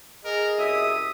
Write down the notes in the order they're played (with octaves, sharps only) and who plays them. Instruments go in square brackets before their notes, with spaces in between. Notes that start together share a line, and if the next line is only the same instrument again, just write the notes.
[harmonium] G#4 D#5 [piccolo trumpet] A#4
[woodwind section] C2 F#2 E5 [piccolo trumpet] D#6